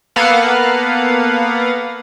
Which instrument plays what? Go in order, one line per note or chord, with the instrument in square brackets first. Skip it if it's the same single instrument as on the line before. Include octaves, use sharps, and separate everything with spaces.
[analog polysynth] A#3 B3 A4 B4 F5 F#5